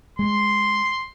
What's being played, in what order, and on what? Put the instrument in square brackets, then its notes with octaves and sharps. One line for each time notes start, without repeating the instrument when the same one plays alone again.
[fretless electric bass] G#3 [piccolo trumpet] C6